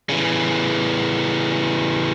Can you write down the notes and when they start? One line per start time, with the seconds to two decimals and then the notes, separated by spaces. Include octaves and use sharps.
0.09 C#3 E3